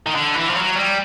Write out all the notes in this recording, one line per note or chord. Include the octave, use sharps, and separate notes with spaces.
D#3
D3
E3
F3
F#3
G3